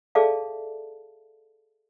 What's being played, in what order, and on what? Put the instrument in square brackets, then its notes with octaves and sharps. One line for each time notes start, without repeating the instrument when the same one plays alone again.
[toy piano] G#4 A4 D5 E5 F5 A5